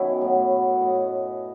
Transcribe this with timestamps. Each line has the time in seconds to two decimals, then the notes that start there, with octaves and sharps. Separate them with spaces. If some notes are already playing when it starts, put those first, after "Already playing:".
Already playing: F#2 D#3 B3 C#4 E4
0.21 A2 F#3
0.52 F#4
0.62 A4
0.71 B4
0.81 A2 F#3 D#5